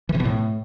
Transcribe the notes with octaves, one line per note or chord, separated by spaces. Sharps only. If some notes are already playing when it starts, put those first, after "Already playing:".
E3
C3
B2
A2